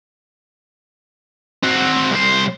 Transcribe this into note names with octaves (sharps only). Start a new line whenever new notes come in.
C4 F#4
C2 C5